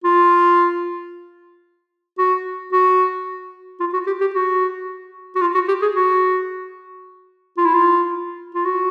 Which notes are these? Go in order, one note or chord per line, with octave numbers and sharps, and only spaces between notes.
F4
F#4
F#4
F4
F#4
G4
G4
F#4
F#4
F4
F#4
G4
G#4
F#4
F4
E4
F4
F4
F#4